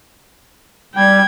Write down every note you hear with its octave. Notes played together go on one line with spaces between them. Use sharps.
G3 G5 G#6